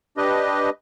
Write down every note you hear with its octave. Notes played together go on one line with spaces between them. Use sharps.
D4 G4 B4 D#5